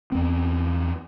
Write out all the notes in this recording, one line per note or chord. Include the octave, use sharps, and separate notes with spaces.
E2 C4